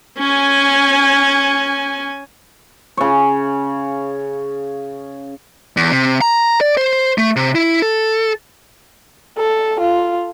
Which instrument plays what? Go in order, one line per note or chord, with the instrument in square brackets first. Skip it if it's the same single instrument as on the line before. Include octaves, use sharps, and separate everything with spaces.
[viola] C#4 G#5
[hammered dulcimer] C#3 C#5
[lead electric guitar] E2
C3
A#5
D5
C5
A3
C3
E4
A4
[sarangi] A4
F4